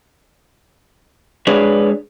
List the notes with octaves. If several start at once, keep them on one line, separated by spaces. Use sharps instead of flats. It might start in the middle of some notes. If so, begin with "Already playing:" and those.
G#3 D4 G#4 B4 C#5 D5